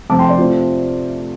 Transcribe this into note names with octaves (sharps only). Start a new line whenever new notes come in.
F2 C3 A3 C4 A5 D6
G5 C6
D5
C3 A3 C4 F4